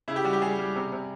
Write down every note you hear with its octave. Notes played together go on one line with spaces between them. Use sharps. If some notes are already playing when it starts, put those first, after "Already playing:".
C#3 E4
G4
G3 F#4
G4
G3 G#4
G3
C3
C3